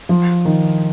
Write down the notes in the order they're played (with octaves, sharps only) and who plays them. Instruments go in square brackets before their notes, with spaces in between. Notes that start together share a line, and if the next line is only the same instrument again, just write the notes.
[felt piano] F3
D#3